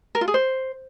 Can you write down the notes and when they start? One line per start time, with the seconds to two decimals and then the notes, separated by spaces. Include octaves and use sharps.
0.15 A#4
0.21 F4
0.28 G#4
0.34 C5